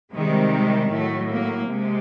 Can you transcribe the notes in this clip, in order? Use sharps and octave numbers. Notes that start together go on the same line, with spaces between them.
C3 D#3 G3 G#3
G#3
A2 F#3 A3
A#3
C3 G#3